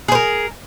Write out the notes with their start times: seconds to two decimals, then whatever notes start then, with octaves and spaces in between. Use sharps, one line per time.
0.08 G#4
0.12 C5
0.15 A#4